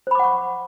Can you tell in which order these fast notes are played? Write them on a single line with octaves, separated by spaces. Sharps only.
C5 B5 D6 F#5 C#6